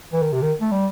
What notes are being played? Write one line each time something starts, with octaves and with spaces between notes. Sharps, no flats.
E3
D#3
C3
D#3
A3
G3